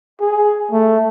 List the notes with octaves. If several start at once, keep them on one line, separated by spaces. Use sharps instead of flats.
G#4
A3